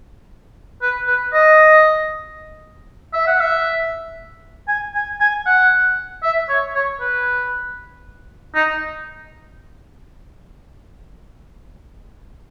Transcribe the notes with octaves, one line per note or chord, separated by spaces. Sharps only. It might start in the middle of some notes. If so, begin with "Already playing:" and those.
B4
B4
D#5
E5
F#5
E5
G#5
G#5
G#5
F#5
E5
C#5
C#5
B4
D#4